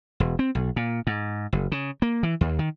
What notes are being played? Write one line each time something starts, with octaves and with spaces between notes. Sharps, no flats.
E1
C4
B1
A#2
G#2
F#1
C#3
A#3
E3
D#2
D#3